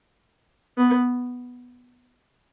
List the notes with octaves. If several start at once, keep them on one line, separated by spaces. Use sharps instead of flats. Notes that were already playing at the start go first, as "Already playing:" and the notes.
B3